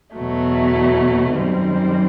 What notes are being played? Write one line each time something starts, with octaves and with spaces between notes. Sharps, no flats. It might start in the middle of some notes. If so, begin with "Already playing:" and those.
E2 B2 F#3 A3
F#2 D#3 G3 C4